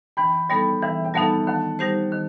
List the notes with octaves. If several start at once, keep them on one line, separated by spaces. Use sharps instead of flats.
E3 G5 B5
G3 B3 D#4 A4 G5 B5
E3 E5 G5
G5
G3 B3 D#4 A4 F#5 A5
D#3 F#5 A5
G3 D#4 G4 C5
D#3